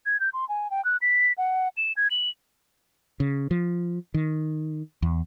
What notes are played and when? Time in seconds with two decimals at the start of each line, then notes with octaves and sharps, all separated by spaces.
0.06 G#6
0.20 G6
0.33 C6
0.49 G#5
0.71 G5
0.85 F#6
1.01 B6
1.38 F#5
1.77 E7
1.97 G#6
2.11 F#7
3.20 C#3
3.51 F3
4.14 D#3
5.02 E2